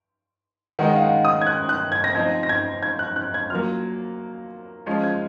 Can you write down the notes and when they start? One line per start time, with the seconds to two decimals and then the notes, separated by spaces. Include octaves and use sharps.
0.79 D#3 G#3 D#4 F#5
0.96 F5
1.02 F#5
1.25 D#6
1.42 G#6
1.47 F#6
1.69 F#6
1.92 G#6
2.04 A#6
2.15 F3 C4 D#4 G#6
2.43 A#6
2.49 G#6
2.83 G#6
2.99 F#6
3.16 F#6
3.34 G#6
3.50 F#3 A#3 F4 F6
4.86 F3 G#3 C#4 F4 G#6
5.03 G#6